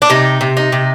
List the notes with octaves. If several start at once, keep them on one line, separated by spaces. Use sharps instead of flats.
D4
C3 D#4
C3
D#4
C3